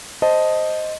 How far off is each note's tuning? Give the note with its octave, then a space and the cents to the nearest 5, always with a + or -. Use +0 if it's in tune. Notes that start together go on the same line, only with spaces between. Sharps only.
C5 +0 D#5 +0 A5 +0